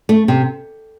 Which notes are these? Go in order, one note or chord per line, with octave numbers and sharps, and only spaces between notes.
A3
C3